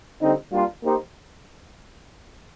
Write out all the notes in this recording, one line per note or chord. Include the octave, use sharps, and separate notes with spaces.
D3 G3 C4 D#4
G3 A#3 D4 F4
A#3 D#4 G4 C5